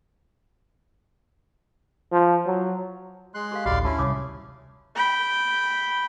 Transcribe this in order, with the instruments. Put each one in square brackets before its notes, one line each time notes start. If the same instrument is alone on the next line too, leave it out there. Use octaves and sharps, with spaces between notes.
[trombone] F3
F#3
[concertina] G#3 C6 F#6
[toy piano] G4 A4 F5
[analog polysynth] A1 D2 [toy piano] F#4 G4 B5 [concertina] D5 F5 C6
[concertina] C#4 E4 [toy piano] F#4 A5
[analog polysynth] C2 [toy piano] C#5 D6 D#6
[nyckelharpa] G5 B5